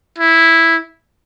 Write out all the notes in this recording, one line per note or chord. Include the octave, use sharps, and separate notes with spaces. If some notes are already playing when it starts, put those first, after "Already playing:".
E4